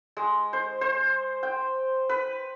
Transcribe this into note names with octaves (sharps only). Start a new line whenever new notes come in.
G#3
C5
C5
G5
B4